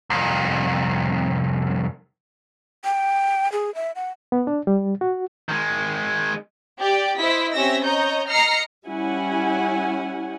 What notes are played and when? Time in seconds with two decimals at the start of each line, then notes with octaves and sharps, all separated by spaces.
0.10 C2 F2
2.85 G5
3.52 G#4
3.75 E5
3.96 F#5
4.32 B3
4.47 D4
4.67 G3
5.01 F#4
5.49 D#3 G#3
6.79 G4 D5
7.17 E4 C5 D#5 B6
7.54 C4 C#4 G4 E5 E6 A#6
7.84 C#5 D#5 A#5 G6
8.28 D#5 A#5 F6 A#6 C7 C#7
8.87 G3 C#4 E4 F#5 G#5